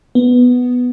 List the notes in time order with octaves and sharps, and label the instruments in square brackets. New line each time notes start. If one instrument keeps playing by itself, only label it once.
[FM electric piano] B3